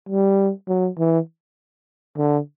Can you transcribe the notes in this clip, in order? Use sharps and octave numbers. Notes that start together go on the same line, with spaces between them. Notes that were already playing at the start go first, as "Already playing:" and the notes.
G3
F#3
E3
D3